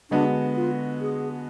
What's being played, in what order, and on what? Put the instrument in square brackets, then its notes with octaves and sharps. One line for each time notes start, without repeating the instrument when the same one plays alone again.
[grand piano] D3 G#3 B3 F#4 [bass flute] D4
[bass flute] F4
G#4